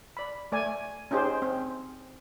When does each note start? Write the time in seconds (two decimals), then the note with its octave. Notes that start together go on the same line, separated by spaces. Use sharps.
0.17 D5 B5
0.52 A3 D5 G#5
1.11 C#4 D#4 G4 G#4 C5
1.42 C4